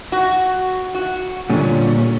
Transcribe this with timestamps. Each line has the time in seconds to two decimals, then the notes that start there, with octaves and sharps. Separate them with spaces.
0.12 F#4
0.95 F#4
1.50 A#2 D3 G3 C#4